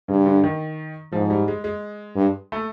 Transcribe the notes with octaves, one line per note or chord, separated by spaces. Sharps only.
G2 C#3
D3
D#3
G#2 F3
G3
G#3
G#3
G2
A3